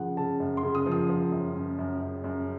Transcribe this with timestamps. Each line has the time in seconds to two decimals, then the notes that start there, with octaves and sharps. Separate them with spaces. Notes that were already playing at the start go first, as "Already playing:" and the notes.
Already playing: C#3 F3 F#5
0.17 C#3 A5
0.40 F#2
0.57 C6
0.63 C#3
0.75 D#6
0.86 F3
0.92 D#6
1.09 F3
1.32 F#2
1.55 F#2
1.79 F#2
2.01 F#2
2.24 F#2